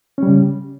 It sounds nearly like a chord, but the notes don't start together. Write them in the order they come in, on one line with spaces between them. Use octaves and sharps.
C#4 G3 C#3